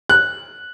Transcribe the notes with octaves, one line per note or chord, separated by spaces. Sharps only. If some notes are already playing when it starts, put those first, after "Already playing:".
F#6